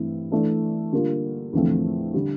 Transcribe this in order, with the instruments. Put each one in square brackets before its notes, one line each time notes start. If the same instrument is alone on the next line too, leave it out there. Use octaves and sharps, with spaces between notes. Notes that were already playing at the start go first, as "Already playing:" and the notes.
Already playing: [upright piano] G2 E3 A3 C4 E4
E3 A3 D4 A4
D3 G3 A#3 F4
E2 D3 F3 A3 C4
D3 G3